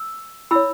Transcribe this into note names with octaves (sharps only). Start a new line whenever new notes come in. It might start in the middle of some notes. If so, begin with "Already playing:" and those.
Already playing: E6
E4 C#5 B5 E6